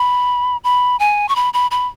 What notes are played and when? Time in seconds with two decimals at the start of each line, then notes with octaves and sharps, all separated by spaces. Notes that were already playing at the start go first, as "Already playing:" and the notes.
Already playing: B5
0.64 B5
1.00 G#5
1.29 C#6
1.36 B5
1.54 B5
1.71 B5